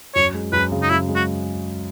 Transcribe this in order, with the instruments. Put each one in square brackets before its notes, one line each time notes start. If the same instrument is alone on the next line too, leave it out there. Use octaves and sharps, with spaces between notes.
[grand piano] F#2 [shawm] C#5
[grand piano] G#3
[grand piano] F#2 [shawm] B4
[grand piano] C#3
[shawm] D#4
[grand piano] F#2 [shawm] E4
[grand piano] G#3
[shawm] F#4